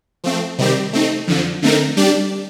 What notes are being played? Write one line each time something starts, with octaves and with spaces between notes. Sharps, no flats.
F3 A3 C4
C3 D#3 G3 C4 G4
A3 C4 D#4
F2 D3 F3
D3 A3 C4 D#4 A#4
G3 D4 G4 D5